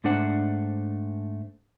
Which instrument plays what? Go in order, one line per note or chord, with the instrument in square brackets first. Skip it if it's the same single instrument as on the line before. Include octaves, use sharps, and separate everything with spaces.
[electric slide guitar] G#2 A3 D4 C5 F#5